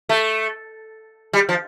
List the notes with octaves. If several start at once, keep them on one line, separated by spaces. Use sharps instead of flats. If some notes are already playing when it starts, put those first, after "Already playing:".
A3
G3
F3